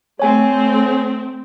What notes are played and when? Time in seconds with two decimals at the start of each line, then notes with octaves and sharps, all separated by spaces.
0.19 A3 C4 C#5 G#5